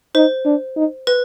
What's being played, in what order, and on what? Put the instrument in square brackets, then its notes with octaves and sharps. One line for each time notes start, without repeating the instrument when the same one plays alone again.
[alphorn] D#4 [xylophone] C5
[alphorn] D4
D#4
[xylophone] B4